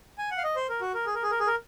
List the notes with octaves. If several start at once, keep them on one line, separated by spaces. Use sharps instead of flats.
G#5
F#5
F5
D#5
C5
A#4
F#4
A#4
G#4
A#4
G#4
A#4
G#4
A#4